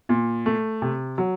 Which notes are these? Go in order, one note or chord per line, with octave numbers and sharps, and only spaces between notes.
A#2
A3
C3
F#3